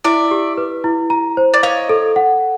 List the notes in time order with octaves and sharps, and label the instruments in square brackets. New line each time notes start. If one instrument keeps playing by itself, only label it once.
[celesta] E4 [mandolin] D5 E5
[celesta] G4
B4
E4
A#5
C5
[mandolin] D5
[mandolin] C#5 D#5 [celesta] F5
[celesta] A4
F#5